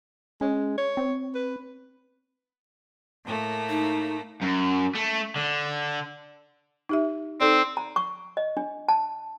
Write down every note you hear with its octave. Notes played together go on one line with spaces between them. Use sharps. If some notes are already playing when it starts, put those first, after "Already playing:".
G#3 C#4
C#5
C4
B4
A2 A3 A#3
D#4
F#2
A3
D3
D#4 G4 E5
C4 D#4 A4 D5
A#5
C#6
D#5
D4
A5